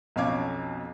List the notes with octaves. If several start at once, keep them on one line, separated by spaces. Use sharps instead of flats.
B1 F2 C#4 F5 D6 G#6